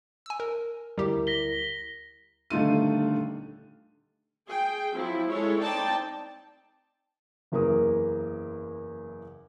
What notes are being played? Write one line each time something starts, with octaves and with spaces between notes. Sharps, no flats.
G#5 E6
A#4
D2 G3 E4 G4 A#4
A#6 B6 G7
D#1 D3 A3 D#4 F4 D#7
G#4 G5
F3 F#3 C4 E4
G#3 E4 A4 C#5
C4 D#4 D5 G5 A5
F#1 E2 A#3 A#4 D#6